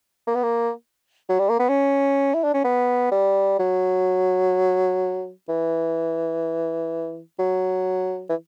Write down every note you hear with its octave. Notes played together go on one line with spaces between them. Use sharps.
A#3
B3
A#3
F#3
G3
A#3
B3
C#4
E4
D4
C#4
B3
G3
F#3
E3
F#3
E3